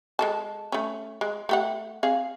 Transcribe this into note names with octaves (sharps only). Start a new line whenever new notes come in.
G#3 A4 A5
A3 C#4
G#3
A3 G4 F#5
C4 G#4 F5